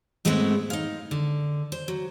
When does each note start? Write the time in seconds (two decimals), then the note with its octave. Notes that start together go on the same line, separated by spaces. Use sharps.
0.25 G#2 G#3 A3 B3 C4 E4
0.70 D#4 F5
1.11 D3
1.72 C5
1.88 F#3